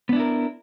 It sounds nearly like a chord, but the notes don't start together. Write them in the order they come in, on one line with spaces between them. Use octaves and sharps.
B3 D4 E4 A#4